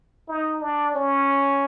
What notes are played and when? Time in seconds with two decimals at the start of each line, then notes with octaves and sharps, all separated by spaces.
0.28 D#4
0.62 D4
0.95 C#4